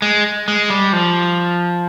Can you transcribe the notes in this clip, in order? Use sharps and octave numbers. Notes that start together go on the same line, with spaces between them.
G#3
G#3
G3
F3